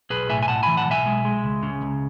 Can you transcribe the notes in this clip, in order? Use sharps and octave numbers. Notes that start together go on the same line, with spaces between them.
B1 G#4 B4
A2 E5 G#5
G#5
A2 F#5 A5
E3 G#5 B5
F#5 A5
B1 E5 G#5
G#3
G#3
C#2
C#3
C#2